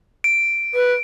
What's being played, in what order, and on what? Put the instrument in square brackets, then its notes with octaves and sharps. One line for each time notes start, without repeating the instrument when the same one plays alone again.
[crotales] D7
[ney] B4